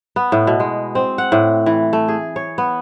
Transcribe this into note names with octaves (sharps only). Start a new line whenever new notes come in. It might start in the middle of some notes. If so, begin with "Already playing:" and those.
B3
A2
B2
G#3
C4
F#5
A2
E3
A3
G#4
C#5
B3